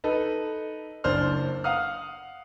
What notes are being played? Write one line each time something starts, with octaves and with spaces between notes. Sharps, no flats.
D#4 A4 B4
F#1 D4 C5 F6
F5 F#5 D#6 F6